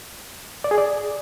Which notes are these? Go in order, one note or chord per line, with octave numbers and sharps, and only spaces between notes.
D5
G#4
D5